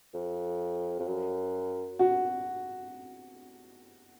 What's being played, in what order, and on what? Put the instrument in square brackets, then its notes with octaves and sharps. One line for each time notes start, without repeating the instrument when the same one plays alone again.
[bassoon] F2
F2
F#2
[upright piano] F#4